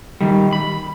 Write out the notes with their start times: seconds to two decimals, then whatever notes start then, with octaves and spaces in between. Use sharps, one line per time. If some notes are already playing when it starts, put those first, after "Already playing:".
0.21 D#3 G3
0.53 B5